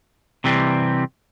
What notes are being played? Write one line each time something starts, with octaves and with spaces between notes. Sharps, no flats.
C3 E3 G3 C4